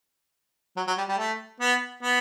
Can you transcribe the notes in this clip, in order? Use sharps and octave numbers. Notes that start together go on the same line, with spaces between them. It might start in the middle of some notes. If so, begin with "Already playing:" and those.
F#3
F#3
G3
G3
A3
B3
B3